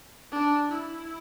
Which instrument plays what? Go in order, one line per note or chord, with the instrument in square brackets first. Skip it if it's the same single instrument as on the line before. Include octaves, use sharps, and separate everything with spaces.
[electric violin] D4
E4